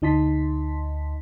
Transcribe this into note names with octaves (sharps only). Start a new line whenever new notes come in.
D2 D#4 D#5 A5 C6 B6